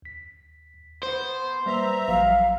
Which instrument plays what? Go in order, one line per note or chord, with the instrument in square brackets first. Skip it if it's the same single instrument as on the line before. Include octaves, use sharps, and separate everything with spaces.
[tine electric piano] D#2 B6
[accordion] B3 [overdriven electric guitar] C5 [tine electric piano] C6
[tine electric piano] G3 A#3 B4 [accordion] E5 A#5
[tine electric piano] A1 F3 F#3 [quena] F5